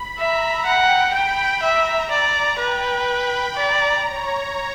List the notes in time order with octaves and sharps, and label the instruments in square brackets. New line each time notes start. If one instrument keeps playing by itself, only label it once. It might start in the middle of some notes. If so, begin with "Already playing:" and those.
Already playing: [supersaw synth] B5
[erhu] E5 [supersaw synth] A#5
[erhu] F#5 [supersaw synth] G5
[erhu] G5 [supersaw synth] B5
[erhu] E5 [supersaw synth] A#5
[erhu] D5 [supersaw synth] A#5
[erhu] B4 [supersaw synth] G5
[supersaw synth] B5
[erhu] D5 [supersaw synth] A#5
[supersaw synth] C#5